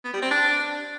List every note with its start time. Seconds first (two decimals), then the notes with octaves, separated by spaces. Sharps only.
0.05 B3
0.13 G3
0.22 C4
0.31 D4